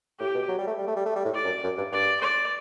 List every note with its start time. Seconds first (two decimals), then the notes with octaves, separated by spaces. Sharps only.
0.20 A2 G4
0.35 B2
0.48 F#3
0.58 G3
0.67 A3
0.78 G3
0.87 A3
0.96 G3
1.06 A3
1.16 G3
1.25 A2
1.35 D5
1.44 F#2
1.64 F#2
1.78 G2
1.92 G2 D5
2.21 D5